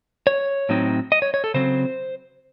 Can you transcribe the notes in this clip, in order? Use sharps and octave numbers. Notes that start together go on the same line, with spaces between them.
C#5
A2 F#3 C4 D#4
D#5
C#5
C#5
A4
C#3 F#3 C4 C5